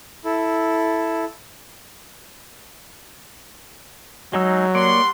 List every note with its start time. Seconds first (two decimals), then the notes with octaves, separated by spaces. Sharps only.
0.25 E4 A4
4.33 F#3 G#3 D#4 E6
4.75 G3 A#3 C#5 D5 F#5 C6